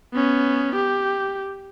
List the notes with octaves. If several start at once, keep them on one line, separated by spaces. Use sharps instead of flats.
B3 C#4
G4